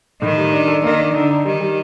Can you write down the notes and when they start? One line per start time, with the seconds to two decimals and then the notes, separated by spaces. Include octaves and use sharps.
0.22 A2 D#3
0.37 G3
0.53 D4
0.68 A4
0.84 D#3 A#3
0.99 D4
1.14 D3 D#4
1.30 D#4
1.45 D#3 G3
1.60 G3